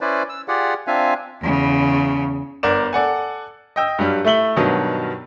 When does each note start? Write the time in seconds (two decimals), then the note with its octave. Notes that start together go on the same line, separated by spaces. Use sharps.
0.01 C#4 E4 B4 C5 D5
0.29 E6
0.48 F4 G4 G#4 D5 F#5
0.87 C4 D4 F4 E5 F5 G#5
1.41 E2 C#3
2.63 G1 A#4 D5 E7
2.93 A4 D5 F#5 G#5
3.76 D#5 G5 E6
3.99 G2 F#3 G3
4.25 A3 E4 E5 F#7 G7
4.56 G2 B2 D#3 F#3